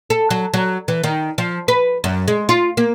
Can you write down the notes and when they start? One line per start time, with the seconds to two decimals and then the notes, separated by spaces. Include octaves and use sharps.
0.10 A4
0.30 F#3
0.54 F#3
0.88 E3
1.04 D#3
1.38 F3
1.68 B4
2.04 F#2
2.28 G#3
2.49 F4
2.77 A#3